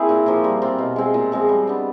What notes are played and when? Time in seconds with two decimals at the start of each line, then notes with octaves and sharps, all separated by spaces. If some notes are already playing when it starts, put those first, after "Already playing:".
Already playing: A#3 C4 E4 G#4
0.09 A#2
0.26 F3 A#3
0.44 G3
0.62 C4 F4
0.78 B2
0.96 G#3 C4
1.14 A#2
1.32 F3 G#3 C4
1.49 G3
1.67 B3 D4